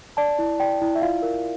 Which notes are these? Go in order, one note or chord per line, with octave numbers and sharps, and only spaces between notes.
D5 A5
E4
D5 G5
E4
E5
F4 F5
A#4